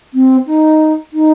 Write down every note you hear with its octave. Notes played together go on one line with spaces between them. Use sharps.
C4
D#4
D#4